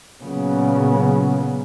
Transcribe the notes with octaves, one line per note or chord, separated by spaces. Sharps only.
A#2 C#3 F#3 B3